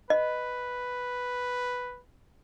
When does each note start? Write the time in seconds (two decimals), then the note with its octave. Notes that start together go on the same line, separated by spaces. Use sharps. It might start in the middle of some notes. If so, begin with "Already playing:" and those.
0.10 B4 D#5